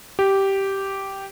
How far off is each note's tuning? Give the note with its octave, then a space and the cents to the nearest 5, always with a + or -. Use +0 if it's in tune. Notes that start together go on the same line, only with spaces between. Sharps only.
G4 -10